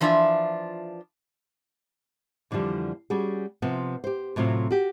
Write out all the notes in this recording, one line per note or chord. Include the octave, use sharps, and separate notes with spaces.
E3 F3 D4 F4 E5
F2 D3 E3 F3 G3
G3 C#4 F#4 G#4
C3 F3 B3
G4 C5
A2 C3 F#3 C4 F4
F#4 G4